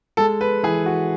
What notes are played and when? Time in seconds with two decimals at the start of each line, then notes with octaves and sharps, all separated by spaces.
0.17 G#3 A4
0.41 B4
0.63 E3 G#4
0.86 F#4